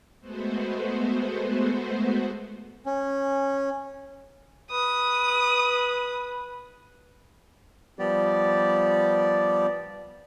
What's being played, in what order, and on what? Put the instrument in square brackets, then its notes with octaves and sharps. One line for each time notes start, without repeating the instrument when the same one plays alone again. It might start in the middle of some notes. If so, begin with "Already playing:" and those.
[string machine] G#3 A3 B3 F#4 C5
[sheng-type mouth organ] C#4
[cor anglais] B4 [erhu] D#6
[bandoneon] F3 G3 B3 G4 D5